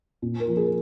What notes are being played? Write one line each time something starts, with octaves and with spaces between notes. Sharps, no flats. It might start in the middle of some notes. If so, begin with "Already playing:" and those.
A#2
A#4
F3
G#4
A#4